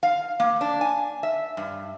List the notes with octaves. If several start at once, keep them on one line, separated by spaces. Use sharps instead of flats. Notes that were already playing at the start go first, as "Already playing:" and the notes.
F5
A#3
D4
G#5
E5
G2